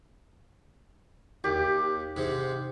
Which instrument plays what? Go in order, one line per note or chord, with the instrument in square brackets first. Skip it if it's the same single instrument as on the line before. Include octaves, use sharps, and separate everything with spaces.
[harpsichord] D#2 [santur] G4
[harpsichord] G#2 C3